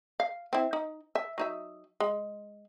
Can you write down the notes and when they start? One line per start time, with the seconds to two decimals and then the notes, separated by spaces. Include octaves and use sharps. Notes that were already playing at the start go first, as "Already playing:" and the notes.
0.20 F5
0.53 C4 E4
0.73 D#4
1.15 E5
1.38 F#3 D#4 E5
2.00 G#3